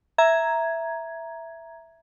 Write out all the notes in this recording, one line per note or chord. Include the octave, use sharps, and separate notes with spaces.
E5 A#5 G#6